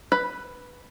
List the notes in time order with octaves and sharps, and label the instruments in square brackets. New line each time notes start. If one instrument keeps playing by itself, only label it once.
[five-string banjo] B4 B5